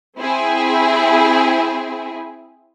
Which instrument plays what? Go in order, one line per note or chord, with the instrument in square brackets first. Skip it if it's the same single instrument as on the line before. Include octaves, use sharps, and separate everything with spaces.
[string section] C4 E4 G#4